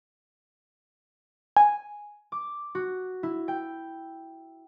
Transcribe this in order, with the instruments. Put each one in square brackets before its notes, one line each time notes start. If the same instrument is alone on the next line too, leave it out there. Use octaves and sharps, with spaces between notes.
[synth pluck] G#5
[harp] D6
F#4
E4
G5